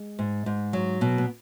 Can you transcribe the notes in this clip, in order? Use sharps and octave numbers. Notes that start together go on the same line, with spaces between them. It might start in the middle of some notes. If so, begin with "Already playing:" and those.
Already playing: G#3
G#2
G#2
F#3
B2
B3